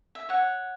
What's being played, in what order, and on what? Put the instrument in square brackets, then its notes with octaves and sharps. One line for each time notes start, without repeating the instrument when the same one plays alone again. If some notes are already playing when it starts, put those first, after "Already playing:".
[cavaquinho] E5
C#5 F#5